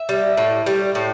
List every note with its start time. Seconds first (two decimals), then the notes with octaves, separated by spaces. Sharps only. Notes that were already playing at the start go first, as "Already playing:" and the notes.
Already playing: E5
0.09 G3
0.37 A2
0.66 G3
0.95 A2